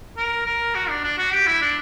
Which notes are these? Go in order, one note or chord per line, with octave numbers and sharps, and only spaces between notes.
A#4
A#4
F#4
D4
D4
F#4
G4
E4
D4